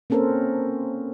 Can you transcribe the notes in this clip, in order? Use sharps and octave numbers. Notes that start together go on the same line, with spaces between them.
A#3 C4 C#4 A4 A#4 C5